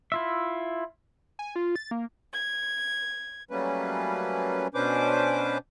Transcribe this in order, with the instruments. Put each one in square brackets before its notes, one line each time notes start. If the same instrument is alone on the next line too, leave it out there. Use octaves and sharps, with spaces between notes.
[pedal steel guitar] E4 F4 E5
[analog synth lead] G#5
F4
A6
A#3
[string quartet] G#6
[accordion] F#3 G3 A3 A#3 C#4 B4
B2 C#4 D4 B4 C5 D6